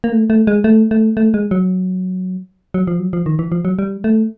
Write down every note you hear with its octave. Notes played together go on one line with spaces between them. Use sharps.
A#3
A3
A3
G#3
A3
A3
A3
G#3
F#3
F#3
F3
F#3
F3
D#3
E3
F3
F#3
G3
A3